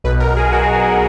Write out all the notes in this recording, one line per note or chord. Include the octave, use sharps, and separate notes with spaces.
B1 B2 B4
A#4
G#4
F#4